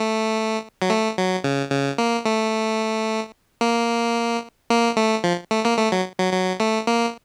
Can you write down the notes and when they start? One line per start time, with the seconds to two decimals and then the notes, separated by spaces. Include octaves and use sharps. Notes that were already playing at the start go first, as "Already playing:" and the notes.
Already playing: A3
0.82 F#3
0.90 A3
1.17 F#3
1.44 C#3
1.71 C#3
1.98 A#3
2.25 A3
3.61 A#3
4.70 A#3
4.97 A3
5.24 F3
5.51 A3
5.65 A#3
5.79 A3
5.92 F#3
6.19 F#3
6.33 F#3
6.60 A3
6.87 A#3